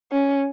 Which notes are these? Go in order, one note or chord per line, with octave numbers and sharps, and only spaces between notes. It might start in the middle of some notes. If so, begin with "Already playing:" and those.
C#4